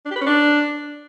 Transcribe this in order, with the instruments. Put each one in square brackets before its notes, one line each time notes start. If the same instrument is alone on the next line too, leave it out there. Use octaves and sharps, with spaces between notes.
[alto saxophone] D4
G4
B4
C#4
D4